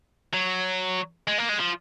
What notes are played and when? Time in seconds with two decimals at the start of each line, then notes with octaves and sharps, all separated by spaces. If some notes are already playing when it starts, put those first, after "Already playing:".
0.33 F#3
1.28 G#3
1.38 A#3
1.49 G#3
1.60 F3